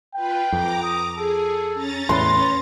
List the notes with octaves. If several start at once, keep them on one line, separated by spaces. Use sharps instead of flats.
F4 B4 G5
F2 A#5 D6
D#6
G#4 A4
C#4 A#5 A6
E2 A2 B4 C6